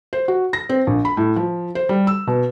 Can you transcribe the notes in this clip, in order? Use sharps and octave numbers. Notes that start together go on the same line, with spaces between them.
C5
F#4
A#6
C4
A#1
B5
A2
F3
C5
G3
E6
B2